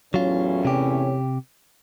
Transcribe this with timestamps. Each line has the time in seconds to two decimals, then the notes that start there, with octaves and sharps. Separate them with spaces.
0.14 E2 A2 F#3 C#4 F4
0.65 C3 G4